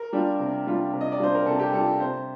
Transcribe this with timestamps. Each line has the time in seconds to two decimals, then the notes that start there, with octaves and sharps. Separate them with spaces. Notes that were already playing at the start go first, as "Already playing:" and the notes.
Already playing: A#4
0.13 G3 D4 F4
0.39 C3
0.67 G3 D4 F4
0.93 C3
1.01 D#5
1.12 D5
1.20 G3 D4 F4 C5
1.35 A#4
1.46 C3 A4
1.60 G4
1.73 G3 D4 F4 A4
2.00 C3 C5